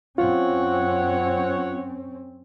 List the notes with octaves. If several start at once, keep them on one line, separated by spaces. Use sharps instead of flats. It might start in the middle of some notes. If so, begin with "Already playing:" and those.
F#2 C4 C#4 F4 C#5 F#5